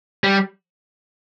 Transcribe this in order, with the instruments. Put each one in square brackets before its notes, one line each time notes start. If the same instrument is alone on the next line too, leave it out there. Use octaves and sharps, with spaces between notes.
[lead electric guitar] G3